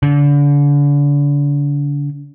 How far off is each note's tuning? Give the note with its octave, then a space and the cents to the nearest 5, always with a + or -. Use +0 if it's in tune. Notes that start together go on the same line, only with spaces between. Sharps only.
D3 -35